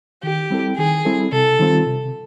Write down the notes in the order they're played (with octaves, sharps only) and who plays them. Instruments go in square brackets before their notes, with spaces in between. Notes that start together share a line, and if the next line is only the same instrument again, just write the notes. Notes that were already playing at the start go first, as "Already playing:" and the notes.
[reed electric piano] D#3 [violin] G4
[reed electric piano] G3 C4 E4 A4
[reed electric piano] D#3 [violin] G#4
[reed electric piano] G3 C4 E4 A4
[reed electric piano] C3 [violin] A4
[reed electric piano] D#3 G3 C4 F4
C3